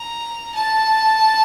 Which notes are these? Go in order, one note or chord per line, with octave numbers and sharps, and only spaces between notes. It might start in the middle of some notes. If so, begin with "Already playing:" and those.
Already playing: A#5
A5